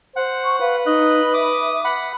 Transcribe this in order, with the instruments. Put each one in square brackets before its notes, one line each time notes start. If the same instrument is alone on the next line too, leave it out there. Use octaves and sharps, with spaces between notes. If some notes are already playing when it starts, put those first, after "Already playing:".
[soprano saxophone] C5 [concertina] F#5
[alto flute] C#6
[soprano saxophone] B4 [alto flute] F5
[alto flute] D#4 [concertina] D#5 F#6
[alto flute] E5 [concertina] D6 D#6
[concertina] F#5 B5